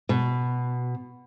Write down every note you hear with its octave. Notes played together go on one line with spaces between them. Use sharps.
B2